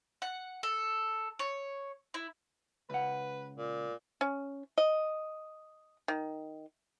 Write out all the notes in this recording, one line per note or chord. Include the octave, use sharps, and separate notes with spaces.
F#5
A4
C#5
E4
C#2 B4 F#5
A#2
C#4
D#5
D#3